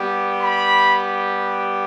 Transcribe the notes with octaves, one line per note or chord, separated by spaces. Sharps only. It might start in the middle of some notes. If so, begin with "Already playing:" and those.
Already playing: G3 B3 G4
B5